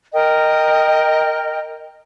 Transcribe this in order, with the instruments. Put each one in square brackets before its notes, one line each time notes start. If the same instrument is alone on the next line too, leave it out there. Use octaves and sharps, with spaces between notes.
[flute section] A#4 D#5 G5